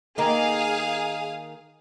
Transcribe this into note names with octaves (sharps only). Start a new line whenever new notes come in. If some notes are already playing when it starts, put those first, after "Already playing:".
D#3 A#3 G#4 F5 D#6